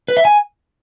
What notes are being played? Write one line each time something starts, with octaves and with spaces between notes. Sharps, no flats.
B4
E5
G#5